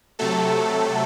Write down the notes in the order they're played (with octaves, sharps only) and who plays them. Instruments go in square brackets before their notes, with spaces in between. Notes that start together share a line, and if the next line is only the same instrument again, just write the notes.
[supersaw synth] C3 F#3 A3 A4